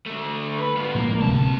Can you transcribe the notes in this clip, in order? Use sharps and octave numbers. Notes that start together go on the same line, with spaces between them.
D3 A3
B4
B3 F4
A2 F3 G#3 A#3
D1 B1 C3 A5